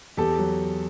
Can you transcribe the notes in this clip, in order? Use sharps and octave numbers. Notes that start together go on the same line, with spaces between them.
E2 G4 A4
F#3